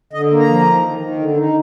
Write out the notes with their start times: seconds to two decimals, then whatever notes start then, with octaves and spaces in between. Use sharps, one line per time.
0.13 D3 D#5
0.31 A#3
0.40 A#5
0.48 F3
0.66 D#3
0.84 D#3
1.00 D#3
1.18 D3
1.37 D#4